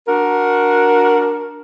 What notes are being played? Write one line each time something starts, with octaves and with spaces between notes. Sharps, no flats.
D4 F#4 A#4